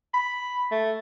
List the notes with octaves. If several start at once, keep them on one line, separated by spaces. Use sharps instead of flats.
B5
A3